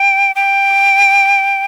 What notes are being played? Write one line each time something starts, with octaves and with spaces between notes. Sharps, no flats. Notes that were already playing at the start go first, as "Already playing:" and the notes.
Already playing: G5
G5